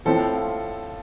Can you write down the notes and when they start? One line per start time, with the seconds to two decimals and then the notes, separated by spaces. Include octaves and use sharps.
0.05 A2 F3 C4 E4 A4
0.34 F4